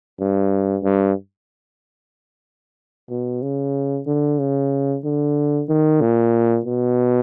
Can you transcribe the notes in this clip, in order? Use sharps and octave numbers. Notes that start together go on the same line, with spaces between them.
G2
G2
B2
C#3
D3
C#3
D3
D#3
A#2
B2